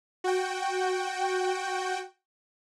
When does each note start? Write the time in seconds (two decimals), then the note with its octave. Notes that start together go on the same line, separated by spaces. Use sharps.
0.24 F#4 G5